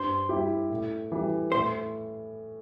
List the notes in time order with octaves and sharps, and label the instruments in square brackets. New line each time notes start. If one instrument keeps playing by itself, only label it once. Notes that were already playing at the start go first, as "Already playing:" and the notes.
Already playing: [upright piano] G2 [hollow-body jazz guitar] C5
[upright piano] G3 E4 G4
A2
E3 G3
[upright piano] A2 [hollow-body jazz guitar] C5